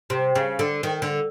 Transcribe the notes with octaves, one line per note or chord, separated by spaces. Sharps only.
C3
C#3
D3
D#3
D3